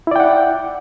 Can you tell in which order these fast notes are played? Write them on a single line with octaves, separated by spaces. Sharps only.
E4 D5 G5 F#5